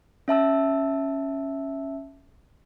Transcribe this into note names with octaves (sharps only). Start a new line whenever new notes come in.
C#4 E5 A5 E6